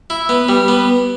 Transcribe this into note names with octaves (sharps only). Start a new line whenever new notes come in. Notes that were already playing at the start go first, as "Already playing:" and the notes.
E4
B3
G3
B3